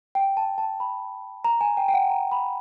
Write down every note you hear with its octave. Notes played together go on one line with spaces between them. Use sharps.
G5
A5
A5
B5
A#5
G#5
G5
G5
F#5
A#5
B5